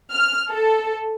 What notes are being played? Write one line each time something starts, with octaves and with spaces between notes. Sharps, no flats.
F6
A4